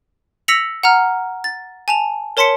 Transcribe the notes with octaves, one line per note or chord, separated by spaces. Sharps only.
E6 A#6 B6 C#7 F7 F#7
F#5 A#5 F6
A6
G#5 A5 F7
A#4 C#5 A5 C6 B6 C#7